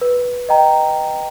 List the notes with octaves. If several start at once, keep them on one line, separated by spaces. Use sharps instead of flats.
B4
D#5 G5 A#5